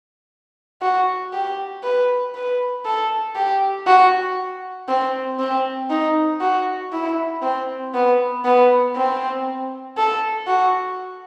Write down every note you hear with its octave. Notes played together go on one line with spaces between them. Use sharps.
F#4
G4
B4
B4
A4
G4
F#4
C4
C4
D#4
F#4
E4
C4
B3
B3
C4
A4
F#4